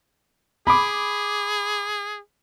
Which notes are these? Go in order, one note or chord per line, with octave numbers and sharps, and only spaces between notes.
G#4 B5 D6